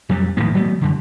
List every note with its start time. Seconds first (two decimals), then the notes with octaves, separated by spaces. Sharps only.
0.09 F2 F#3 G3
0.37 A#1 A2 D#3 A#3
0.55 F#3 A3 B3
0.81 F#2 D3